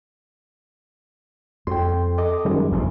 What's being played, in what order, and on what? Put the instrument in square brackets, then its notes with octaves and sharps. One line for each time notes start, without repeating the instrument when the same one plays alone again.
[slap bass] F2 [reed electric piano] G5 C6
[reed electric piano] A4 D#5 D6
[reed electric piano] F#2 G3 G#3 [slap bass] D#3
[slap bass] F1 A#1 C3